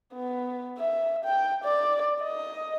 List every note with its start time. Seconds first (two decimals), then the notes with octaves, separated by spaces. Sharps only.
0.14 B3
0.78 E5
1.25 G5
1.64 D5
2.23 D#5